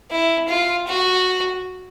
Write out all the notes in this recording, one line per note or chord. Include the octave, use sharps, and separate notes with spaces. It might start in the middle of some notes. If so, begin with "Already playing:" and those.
E4
F4
F#4